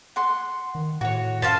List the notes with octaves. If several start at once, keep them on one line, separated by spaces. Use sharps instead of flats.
F#5 C6
D#3
A2 F#4 C#5
F#2 F4 C5 A5